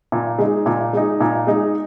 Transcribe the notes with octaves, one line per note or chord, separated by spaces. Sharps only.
A#2
G#3 D#4
A#2
G#3 D#4
A#2
G#3 D#4